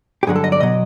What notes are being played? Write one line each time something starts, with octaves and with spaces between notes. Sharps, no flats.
G4
G2 D3 F#3 G#4
A4
D#5
D5
B2 F#3 D#5